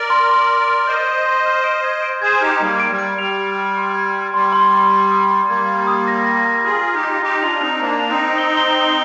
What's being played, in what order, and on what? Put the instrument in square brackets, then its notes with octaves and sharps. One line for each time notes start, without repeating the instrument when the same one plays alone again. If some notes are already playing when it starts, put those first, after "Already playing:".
Already playing: [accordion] A#4 D5
[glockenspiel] C6
C6
C6
C6
[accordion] C5 D#5 [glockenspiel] G6
[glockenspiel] G6
C6
F6
D7
G#6
D7
[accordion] G#4 C5 [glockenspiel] G#6
[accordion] D#4 G4 [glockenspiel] F6
[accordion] G3 A#3 [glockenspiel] G#6
[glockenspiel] D7
[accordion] G3
[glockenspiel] D7
[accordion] G3 [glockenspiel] F7
[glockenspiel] F6
F6
C6
G#6
G#6
[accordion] G3 [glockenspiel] C6
[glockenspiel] C6
C6
C6
D#6
C6
[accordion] G3 A#3 [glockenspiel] G#6
[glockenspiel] G#6
D#6
A#6
A#6
A#5
[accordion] F4 G#4 [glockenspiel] F6
[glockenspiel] F6
[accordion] D#4 G4
[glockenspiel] A#6
[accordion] F4
[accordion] D#4 G4 [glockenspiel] A#5
[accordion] D4 F4 [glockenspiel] F7
[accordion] C4 D#4 [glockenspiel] F7
[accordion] A#3 D4 [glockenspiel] A#5
[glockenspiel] F7
[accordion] C4 D#4
[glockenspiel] A#6
G7
G7
G7